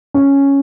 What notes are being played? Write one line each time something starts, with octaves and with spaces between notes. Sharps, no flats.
C#4